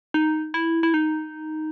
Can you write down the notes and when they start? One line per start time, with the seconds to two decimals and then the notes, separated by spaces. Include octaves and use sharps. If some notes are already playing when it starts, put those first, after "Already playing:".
0.14 D#4
0.54 E4
0.83 E4
0.94 D#4